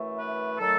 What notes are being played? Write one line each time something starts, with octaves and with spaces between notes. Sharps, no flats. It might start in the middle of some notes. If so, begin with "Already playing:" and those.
Already playing: F#2 E3 A3
B4
D#3 F#3 A3 A4